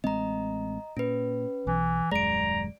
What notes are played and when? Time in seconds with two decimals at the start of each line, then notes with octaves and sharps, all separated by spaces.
0.04 A1 G#3 C4 D#5 A#5
0.97 A#2 C#4 B4
1.67 B1 E3
2.12 D#1 F#2 G#3 D5 A#5 D7